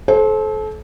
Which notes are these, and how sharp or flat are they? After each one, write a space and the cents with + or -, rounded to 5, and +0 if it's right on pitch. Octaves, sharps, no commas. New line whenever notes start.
A4 -30 C5 +20